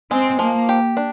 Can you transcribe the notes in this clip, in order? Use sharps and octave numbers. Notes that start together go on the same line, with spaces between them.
G#3 C4
F3 A#3
G4
D4